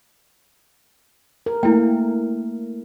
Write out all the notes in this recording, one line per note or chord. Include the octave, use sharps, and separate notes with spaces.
A#4
A3 A#3 D4 E4 G5